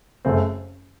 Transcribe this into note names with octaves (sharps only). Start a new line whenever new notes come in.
F#1 F#2 C#3 A3 C4